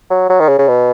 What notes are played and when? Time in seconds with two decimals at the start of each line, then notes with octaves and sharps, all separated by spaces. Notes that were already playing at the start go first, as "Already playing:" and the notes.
0.10 F#3
0.30 F#3
0.40 D#3
0.49 C#3
0.59 C#3
0.68 B2